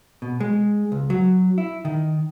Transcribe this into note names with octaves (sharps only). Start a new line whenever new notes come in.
B2
G#3
C#2
F#3
E4
D#3